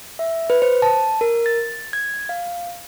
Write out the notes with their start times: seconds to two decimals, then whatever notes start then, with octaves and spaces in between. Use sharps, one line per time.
0.19 E5
0.50 B4
0.62 C5
0.82 A5
1.21 A#4
1.46 A6
1.93 G#6
2.29 F5